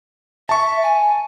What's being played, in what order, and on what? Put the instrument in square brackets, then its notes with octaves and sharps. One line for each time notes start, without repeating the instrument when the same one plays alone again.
[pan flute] E5 [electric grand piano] A5 C#6
[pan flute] G#5